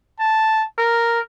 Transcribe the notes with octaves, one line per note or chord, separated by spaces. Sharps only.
A5
A#4